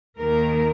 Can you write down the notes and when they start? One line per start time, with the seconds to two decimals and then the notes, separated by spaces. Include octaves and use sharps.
0.18 D#2 D#3 A#3 A#4